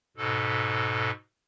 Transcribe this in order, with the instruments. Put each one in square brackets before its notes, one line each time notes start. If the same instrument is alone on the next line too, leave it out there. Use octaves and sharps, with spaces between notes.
[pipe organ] G#2 B2 A4